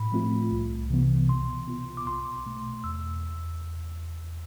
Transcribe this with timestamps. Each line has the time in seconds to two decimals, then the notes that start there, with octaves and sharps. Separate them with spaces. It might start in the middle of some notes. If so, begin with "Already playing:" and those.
Already playing: A2 B5
0.12 F3 A3 C4 F4
0.51 C2
0.90 C3 E3 B3
1.28 B2 C6
1.68 B3 F4
1.97 D6
2.07 B1 C6
2.46 B2 A3
2.84 E2 E6